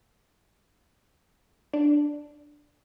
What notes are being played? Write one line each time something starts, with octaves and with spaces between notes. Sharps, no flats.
D4